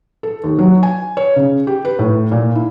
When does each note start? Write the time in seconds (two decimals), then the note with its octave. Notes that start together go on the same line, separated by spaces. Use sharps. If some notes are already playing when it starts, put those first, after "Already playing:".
0.23 A4
0.44 D#2
0.59 F#3
0.83 G#5
1.17 C#5
1.36 C#3
1.67 G4
1.85 B4
1.99 A2
2.32 A#2
2.55 E4